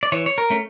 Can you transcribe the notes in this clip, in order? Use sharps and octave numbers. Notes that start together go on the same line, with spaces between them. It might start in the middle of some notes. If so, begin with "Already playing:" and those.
D5
E3 C#5
C#5
A#4
A3 C#4